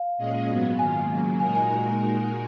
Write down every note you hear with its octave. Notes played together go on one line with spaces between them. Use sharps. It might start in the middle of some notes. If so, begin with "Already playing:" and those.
Already playing: F5
A#2 G#3 C#4 G#4 D#5
G#2 F#3 B3 F#4
G#2 D#3 A#3 F4 G#5
C#3 F#3 A#3
A#2 G#3 D#4 F#4 A#4 G#5
G#5